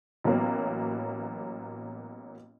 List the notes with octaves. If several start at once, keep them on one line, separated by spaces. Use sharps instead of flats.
A1 F#3 A#3 B3